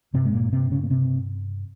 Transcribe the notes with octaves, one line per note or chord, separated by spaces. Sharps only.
G2 C3 C4
G#3
A#2 A#3
C3 C4
C#3 C#4
A#3
C3 C4